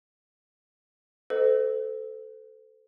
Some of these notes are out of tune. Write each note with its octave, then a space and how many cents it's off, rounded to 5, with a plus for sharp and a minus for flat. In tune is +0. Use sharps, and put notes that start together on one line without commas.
A4 +0 C5 -35 D#5 +0